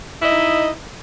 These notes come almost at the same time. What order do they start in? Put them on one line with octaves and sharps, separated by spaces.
E4 D#5 D#4